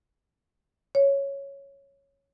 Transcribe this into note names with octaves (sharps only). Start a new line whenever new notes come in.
C#5